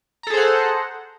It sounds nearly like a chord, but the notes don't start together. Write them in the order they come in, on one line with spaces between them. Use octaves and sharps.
A#5 A4 G#4 C5 F#5